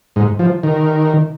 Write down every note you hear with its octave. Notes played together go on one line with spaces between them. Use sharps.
G#2
F3
D#3